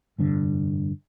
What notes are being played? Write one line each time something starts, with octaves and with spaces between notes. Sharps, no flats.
F1 G2 D3